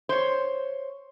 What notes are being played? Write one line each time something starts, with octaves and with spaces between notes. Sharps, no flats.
C5 C#5